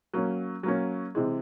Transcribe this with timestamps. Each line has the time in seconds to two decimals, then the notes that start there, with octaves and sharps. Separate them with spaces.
0.13 F#3 A#3 C#4
0.63 F#3 A#3 C#4
1.15 C3 E3 G#3